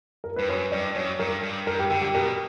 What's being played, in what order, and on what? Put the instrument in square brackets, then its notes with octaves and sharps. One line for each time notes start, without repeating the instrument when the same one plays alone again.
[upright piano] A#4
[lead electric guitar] G2 [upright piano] B4
[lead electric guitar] F#2 [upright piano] C#5
[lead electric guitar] G2 [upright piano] D5
[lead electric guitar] F#2 [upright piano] C#5
[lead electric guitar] G2 [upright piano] A#4
[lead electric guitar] G2
[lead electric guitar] G2 [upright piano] A#4
[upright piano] G4
[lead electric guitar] D3 [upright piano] G4
[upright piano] G4
[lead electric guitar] B2 [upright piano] A#4